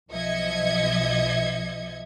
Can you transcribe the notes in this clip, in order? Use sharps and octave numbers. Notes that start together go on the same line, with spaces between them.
B1 F3 D#5 E5 G#6 C#7